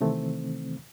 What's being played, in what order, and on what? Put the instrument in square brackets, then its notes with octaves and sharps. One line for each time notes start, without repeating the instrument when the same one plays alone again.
[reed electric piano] C3 D#3 E3 A3 C4